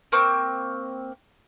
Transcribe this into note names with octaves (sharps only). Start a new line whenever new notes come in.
A#3 C4 C#6